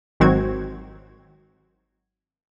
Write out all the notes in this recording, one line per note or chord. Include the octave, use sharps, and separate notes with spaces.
G#1 D#3 F#3 C4 F#4 G#6